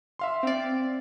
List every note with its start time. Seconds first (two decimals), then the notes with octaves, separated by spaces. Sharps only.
0.19 E5 F5 C6
0.43 C4 D5